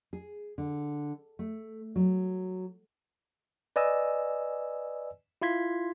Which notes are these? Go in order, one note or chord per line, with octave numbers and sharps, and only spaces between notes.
G#4
D3
A3
F#3
B4 D5 D#5 G#5 E6
E4 F4 C6 G#6 B6